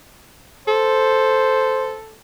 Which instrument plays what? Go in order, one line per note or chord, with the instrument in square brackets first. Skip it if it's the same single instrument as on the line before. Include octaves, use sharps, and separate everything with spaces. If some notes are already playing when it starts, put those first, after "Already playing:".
[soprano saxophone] A4 [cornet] C5